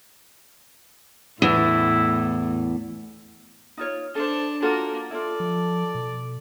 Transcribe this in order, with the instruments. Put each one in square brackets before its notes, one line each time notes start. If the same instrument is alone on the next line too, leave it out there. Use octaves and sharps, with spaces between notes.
[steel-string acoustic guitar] E2 [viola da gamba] A2 [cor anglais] E4
[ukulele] D#4 F4 C#5
[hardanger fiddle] D4 A5 [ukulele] A4 C5
[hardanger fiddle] A#3 [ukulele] F4 F#4 A4
[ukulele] E4 F4 [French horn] A4 [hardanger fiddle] D5
[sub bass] F3
B2